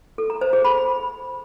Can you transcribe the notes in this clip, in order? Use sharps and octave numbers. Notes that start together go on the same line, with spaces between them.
A4
A#5
C5
G#4
B5